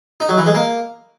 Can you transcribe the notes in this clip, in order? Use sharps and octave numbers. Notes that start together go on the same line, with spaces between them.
D#4
F#3
E3
G#3
A#3